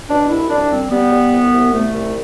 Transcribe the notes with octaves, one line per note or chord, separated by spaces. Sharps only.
B2 D4
C2 E4
C2 D4
G3 C4
G3 B3
G3
C2
C2
C2 A3
C2